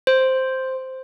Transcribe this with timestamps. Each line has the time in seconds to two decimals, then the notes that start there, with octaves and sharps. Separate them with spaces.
0.07 C5